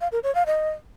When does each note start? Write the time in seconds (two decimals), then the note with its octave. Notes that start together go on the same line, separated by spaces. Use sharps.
0.01 F5
0.12 A#4
0.23 C#5
0.35 F5
0.46 D#5